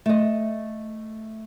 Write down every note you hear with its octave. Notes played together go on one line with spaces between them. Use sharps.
A3 D#5